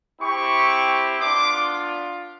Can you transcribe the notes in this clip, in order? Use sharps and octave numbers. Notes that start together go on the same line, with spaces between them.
C4 E4 G4 B5 C#6
B3 D4 F4 C6 D6